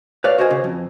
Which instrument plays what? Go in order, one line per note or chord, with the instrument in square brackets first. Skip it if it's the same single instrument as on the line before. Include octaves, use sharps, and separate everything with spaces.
[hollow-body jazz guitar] B4 C#5 D5 F5
F#4 A#4 C5 D#5 G#5
C#3
F2